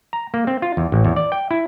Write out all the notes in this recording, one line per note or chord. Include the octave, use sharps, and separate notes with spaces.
A#5
A#3
C4
F4
E2
A1
E2
D5
G5
E4